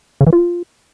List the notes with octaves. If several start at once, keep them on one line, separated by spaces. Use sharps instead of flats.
C#3
E3
F4